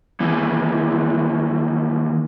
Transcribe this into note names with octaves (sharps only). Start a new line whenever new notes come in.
D#2 E3